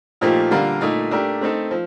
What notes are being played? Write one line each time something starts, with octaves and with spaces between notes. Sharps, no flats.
A#2 F3 A3 D#4 G4
D3 G3 A#3 F4 A#4
A#2 A3 D#4
A3 D4 G4 A#4
A3 C4 D#4 A4
F3